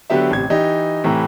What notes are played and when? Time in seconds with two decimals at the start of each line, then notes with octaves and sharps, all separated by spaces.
0.10 D3 F#3 B3 G4 E5
0.31 A1 C3 G#6
0.50 E3 D#4 G4
1.04 A2 C3 E3 A#5